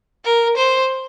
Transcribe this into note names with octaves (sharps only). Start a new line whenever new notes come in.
A#4
C5